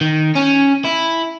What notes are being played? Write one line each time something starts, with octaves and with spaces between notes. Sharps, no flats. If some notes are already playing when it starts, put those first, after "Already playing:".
D#3
C#4
E4